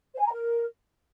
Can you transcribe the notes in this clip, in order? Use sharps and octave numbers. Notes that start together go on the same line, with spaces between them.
C5
G#5
A#5
A#4